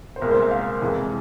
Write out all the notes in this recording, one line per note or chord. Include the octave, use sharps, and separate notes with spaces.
C5
C2 A#2 G#3 A#4
C5
E5
F5
F2 C3 E3 G#3